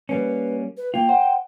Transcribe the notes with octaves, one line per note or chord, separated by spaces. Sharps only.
G3 A#3 C#4 B4
B4
A#3 F4 G5
C5 F#5